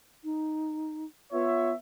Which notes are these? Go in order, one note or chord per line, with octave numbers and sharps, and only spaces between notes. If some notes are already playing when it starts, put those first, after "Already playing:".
D#4
B3 F4 C#5 E5